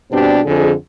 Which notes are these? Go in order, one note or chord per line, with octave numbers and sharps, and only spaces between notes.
G2 B2 C4 D4 G4
F2 D3 G#4